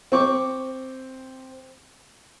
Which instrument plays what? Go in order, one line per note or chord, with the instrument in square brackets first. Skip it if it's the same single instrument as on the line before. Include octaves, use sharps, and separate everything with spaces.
[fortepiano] C4 C#6 D6